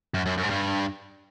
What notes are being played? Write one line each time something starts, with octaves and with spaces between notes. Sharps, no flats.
F#2
F#2
F#2
G#2
G2